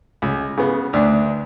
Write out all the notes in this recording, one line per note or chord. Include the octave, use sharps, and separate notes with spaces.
C#2
C#3 B3
D2 D4